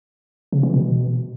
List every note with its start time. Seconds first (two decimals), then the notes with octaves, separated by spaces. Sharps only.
0.52 C#3
0.63 E3
0.74 B2